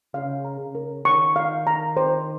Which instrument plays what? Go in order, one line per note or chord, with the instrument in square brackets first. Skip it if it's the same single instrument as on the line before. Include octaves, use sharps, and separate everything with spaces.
[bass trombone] C#3 [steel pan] F5
[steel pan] A#5
[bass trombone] C#3
[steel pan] A#4
[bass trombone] D#3 [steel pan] C#6
[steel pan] F5
A#5
C5